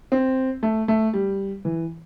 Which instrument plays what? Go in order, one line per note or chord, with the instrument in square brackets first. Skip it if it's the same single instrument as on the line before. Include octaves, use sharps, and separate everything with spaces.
[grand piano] C4
A3
A3
G3
E3